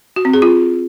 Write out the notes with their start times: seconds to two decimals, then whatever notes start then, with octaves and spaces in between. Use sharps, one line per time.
0.16 F#4
0.25 C4
0.34 G#4
0.42 F4